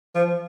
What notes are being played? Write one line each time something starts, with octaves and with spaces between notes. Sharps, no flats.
F3